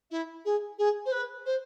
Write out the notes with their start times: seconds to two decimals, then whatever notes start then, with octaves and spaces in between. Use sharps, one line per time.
0.10 E4
0.45 G#4
0.78 G#4
1.05 C5
1.11 B4
1.45 C5